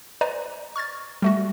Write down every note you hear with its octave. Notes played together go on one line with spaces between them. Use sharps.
B4 C5 D5 D#5 G#5 A#5
C#6 F6 G#6 A6
G3 A3 F#4